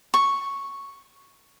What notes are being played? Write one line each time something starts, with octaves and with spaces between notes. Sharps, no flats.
C#6